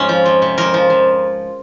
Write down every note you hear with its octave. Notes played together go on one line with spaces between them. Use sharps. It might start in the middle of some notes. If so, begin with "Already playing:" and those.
Already playing: F2 G#2 C#4
F3
F2
C3
F2 A#4
F3
F2